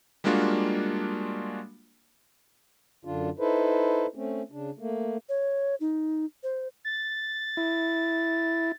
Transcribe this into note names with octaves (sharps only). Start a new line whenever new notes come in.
G3 G#3 A#3 D4 F4 F#4
F#2 D3 D4 F4
D#4 E4 A4 B4 C5
A3 C4 C#4
C#3 D4
A3 A#3
C#5
D#4
C5
A6
E4